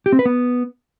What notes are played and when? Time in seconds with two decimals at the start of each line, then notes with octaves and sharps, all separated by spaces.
0.06 G4
0.12 C4
0.19 B4
0.25 B3